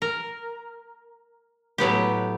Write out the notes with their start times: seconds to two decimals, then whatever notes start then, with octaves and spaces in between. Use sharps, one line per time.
0.02 A#4
1.78 A2 F#3 B3 G4